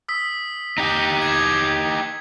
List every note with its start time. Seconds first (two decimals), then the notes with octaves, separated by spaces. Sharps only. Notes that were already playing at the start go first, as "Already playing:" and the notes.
0.08 D#6 E6 B6
0.78 D#4 G4
1.22 G#6 E7